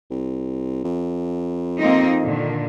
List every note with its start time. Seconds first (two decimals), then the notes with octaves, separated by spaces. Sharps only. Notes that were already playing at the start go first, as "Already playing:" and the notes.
0.10 C2
0.84 F2
1.79 A#3 C4 D#4
2.22 A#2 D3 D#3